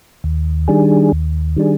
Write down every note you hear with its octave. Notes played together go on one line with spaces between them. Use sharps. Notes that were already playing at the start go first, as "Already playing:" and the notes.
D#2
D#3 G3 D4 G#4
D#2
D#3 G3 D4 G#4